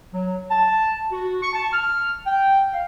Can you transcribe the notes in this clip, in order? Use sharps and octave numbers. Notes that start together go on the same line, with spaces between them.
F#3
A5
F#4
C#6
A5
F6
G5
F5